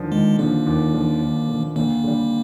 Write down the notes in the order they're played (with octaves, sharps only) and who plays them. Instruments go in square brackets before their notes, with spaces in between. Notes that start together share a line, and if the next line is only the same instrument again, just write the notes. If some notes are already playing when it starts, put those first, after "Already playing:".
Already playing: [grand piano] D#2 D3 F3
[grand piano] D#2 [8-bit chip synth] G#3
[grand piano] D3 F3 [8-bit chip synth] A#3
[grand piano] D#2
D3 F3
D#2
D3 F3
[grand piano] D2 [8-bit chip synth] A#3
[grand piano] D3 G3